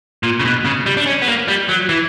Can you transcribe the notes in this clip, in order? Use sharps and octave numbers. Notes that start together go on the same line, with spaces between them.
A#2
C#3
B2
C#3
G3
D4
C#4
B3
A#3
G3
F#3
E3